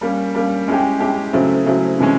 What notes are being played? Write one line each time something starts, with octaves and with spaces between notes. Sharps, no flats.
G3 A#3 C#4
G3 A#3 C#4
G#3 C#4 E4 G4
G#3 C#4 E4 G4
C#3 F#3 A3 C4 E4
C#3 F#3 A3 C4 E4
C3 E3 G#3 C#4